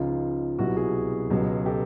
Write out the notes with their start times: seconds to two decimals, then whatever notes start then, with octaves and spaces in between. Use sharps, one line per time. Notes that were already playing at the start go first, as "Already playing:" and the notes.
Already playing: C#2 C#3 F3 D#4 F4
0.58 C2 B2 F#3 E4 F#4
0.76 F#4 G#4
1.30 C#2 B2 F#3
1.66 G4 A4